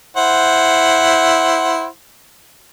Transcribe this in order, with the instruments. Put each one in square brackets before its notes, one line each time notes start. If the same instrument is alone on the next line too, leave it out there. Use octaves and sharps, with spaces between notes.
[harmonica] E4 C5 F#5